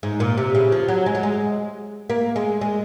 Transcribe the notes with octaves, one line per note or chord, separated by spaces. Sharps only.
G#2
A#2
C3
C#3
F3
F#3
G#3
F#3
G#3
A#3
G#3
G#3